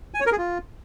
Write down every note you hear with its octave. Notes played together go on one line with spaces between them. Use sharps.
G#5
C#5
A#4
G#4
F4